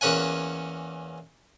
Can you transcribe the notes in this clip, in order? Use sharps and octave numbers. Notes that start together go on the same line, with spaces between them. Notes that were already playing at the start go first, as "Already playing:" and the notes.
E2 A#3 C#4 F#5 G#5